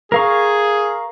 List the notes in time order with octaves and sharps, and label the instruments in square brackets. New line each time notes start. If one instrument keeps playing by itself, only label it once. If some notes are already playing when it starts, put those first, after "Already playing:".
[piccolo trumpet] G#4 [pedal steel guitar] A#4 F5 C#6